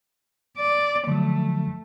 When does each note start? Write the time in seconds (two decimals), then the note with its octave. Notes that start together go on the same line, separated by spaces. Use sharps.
0.57 D5
1.07 D3 F3 F#3 A3